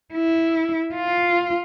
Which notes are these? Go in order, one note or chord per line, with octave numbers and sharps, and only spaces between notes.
E4
F4